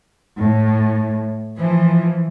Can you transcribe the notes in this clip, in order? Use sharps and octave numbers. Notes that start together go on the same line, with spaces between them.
A2
E3 F3